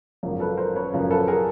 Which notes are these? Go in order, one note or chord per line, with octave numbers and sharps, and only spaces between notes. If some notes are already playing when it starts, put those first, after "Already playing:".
G#1 F#2 C#3 F3
A4 B4
A#4 C5
B4 C#5
G#1 F#2 C#3 F3
A4 B4
G#4 A#4